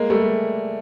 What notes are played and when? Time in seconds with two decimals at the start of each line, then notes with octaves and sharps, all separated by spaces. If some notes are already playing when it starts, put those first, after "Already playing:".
Already playing: G#3 A#3
0.10 G3 A3